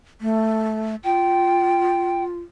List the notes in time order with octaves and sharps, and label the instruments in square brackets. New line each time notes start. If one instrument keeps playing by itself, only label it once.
[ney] A3
[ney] F4 [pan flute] G5